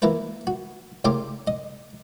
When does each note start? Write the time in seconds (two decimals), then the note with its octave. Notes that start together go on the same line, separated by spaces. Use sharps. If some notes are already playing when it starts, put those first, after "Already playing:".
0.02 E3 A#3 E4 A#4 B4
0.47 F#4
1.05 A2 C#3 G4 A#4 C6 D6
1.47 D#5